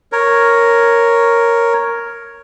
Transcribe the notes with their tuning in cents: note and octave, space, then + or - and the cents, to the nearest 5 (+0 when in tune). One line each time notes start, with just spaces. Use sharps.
A#4 +0 C#5 +0